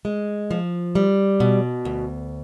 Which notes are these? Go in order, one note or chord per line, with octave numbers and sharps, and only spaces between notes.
G#3
F3
G3
B2
D2